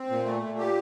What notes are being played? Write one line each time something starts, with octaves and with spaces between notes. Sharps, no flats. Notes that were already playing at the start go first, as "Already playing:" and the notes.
Already playing: C4
A#2
A3
A#2
G4